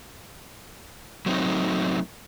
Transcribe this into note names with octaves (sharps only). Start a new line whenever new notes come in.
F#3 A3 C4 D#4